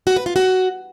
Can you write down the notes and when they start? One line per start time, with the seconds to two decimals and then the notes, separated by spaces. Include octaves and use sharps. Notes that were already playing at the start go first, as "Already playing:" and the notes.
0.07 F#4
0.16 B4
0.26 F4
0.36 F#4